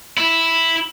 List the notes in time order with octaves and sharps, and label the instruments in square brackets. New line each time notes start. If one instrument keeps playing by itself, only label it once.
[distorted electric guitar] E4